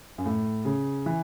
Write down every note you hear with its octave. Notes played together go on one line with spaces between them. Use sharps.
F#2
A2
C#3
E3